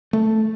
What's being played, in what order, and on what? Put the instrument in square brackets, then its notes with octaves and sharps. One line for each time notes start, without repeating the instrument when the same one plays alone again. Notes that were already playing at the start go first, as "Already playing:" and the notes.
[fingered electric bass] A3